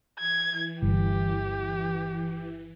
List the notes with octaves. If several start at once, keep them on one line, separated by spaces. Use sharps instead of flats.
E3 G#6
G1 G4